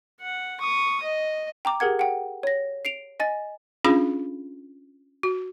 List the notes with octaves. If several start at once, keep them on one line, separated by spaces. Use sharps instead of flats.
F#5
C#6 D#6
D#5
G5 A#5 D6
G4 G#4 A#4 F#5 G#6
F#5 G5
C#5 A#6
C7 D7 F7
D#5 G#5 A6
C#4 D4 F4 G#4 F5 B5
F#4